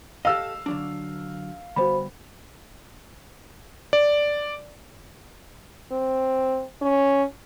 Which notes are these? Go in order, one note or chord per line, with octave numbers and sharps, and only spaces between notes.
G4 A4 D#5 F5 E6
D3 F#3 D4
D3 G3 B3 F#4 C5 B5
D5
C4
C#4